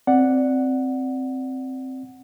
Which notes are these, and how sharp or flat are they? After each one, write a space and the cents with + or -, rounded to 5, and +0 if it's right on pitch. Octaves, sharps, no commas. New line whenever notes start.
C4 +0 D5 +0 F#5 +0